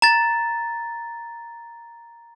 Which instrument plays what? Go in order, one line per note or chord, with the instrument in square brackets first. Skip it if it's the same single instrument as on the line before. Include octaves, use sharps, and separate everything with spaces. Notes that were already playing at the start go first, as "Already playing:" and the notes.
[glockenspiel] A#5 A6